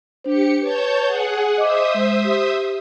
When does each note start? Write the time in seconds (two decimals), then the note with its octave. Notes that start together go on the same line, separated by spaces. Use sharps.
0.24 D4 G4 C5 C#7
0.61 B4 C#5 A5 G6
1.04 G#4 F#5
1.58 C5 D#5 E5 D6 D#6
1.94 G#3
2.25 G4